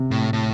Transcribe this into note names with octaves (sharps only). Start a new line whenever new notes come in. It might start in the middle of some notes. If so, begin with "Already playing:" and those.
Already playing: C3
A2
A2